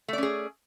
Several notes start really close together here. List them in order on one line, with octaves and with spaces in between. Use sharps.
A3 D5 C#4 G#4